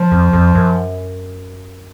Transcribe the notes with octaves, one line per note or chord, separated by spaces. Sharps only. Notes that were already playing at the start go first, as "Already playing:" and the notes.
Already playing: F3
F2
F2
F#2